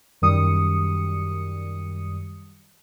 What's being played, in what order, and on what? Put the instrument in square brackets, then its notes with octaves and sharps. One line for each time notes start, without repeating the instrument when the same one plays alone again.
[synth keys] F#2 D#3 G3 D#6 C#7